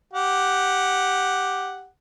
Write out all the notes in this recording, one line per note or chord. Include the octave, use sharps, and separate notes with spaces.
G4 F#5